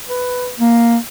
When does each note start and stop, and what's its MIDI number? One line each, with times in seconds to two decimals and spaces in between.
0.09 0.50 71
0.60 0.97 58